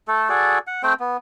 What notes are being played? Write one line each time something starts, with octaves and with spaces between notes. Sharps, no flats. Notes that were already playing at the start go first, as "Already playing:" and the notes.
A3 A4
F#4 G#4 A4 D5
F#5
A3 C4 C5 G5
B3